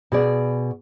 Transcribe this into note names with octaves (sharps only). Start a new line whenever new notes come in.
B2 G#4 D5